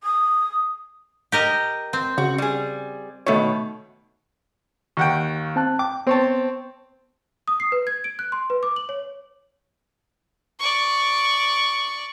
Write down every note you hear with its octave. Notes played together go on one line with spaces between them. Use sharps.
D#6
G4 A#4 D#5
C4
C#3 F#4
G3 G#4
B2 D#3 A3 C#5
D#2 F#5 G5 C#6
C4 A5 F#6
G5 D6
B3 C4 C5 C#5 A5
D#6
C7
B4
G#6
D7
F#6
C6
B4
D6
F#7
C#5
D5 C#6